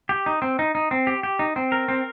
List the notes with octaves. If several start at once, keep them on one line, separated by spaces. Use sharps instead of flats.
G4
D#4
C4
D#4
D#4
C4
G4
G4
D#4
C4
A#4
C4